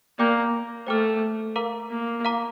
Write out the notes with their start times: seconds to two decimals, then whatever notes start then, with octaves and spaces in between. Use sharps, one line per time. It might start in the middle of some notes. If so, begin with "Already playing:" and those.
0.18 A#3 D5 G5 D6 G6
0.87 A3 C5 G5 D6 F6
1.56 A#4 F5 A#5 D6
1.90 A#3
2.25 F5 A#5 D6